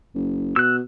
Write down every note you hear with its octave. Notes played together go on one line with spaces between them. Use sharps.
F#1
B2 E6 F#6